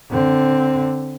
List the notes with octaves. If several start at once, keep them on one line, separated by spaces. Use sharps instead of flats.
D3 C4